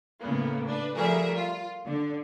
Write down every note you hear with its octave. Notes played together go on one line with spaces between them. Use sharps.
A2 C#3 A#3 B3
D4 B4
F3 G3 A3 G#4 A#4 E5
F4
D3